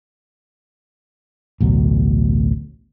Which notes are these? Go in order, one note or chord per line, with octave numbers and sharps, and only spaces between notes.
A1 D2 B2 F#3